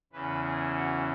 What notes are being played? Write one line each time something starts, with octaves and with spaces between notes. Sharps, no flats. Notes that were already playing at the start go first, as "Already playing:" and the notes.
E2 C#3 E3 B4
G#4
F#4